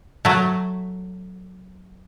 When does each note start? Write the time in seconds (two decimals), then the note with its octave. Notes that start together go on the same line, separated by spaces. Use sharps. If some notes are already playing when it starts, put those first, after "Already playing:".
0.25 F#3 A3